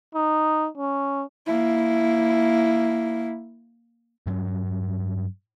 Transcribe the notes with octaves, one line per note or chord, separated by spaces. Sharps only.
D#4
C#4
A#3 E4
G2 F#3 C4 C#4